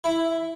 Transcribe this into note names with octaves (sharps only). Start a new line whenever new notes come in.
E4